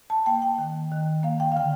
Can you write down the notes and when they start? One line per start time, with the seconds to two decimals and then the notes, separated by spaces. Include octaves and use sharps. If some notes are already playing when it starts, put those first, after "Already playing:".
0.10 A5
0.26 A#3 G5
0.42 G5
0.58 D#3
0.92 D#3
1.23 A#3 F5
1.40 G5
1.52 F5
1.56 D3 G5